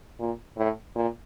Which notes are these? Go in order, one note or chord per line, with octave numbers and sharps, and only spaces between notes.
A#2
A2
A#2